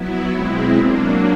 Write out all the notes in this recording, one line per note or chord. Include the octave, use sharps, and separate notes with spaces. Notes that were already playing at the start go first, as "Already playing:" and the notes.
Already playing: F#3 B3 E4
B2 G#3 C4 E4
F#3 A#3 D4